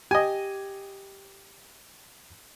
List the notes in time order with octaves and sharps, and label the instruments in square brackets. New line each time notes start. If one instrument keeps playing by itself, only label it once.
[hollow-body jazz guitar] G4 [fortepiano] D#5 G#5